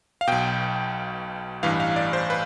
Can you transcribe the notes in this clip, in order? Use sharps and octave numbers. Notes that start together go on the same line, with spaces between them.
F5
B1 B2 G5
A1 G2 E3 F5
F5
D5
C5
B4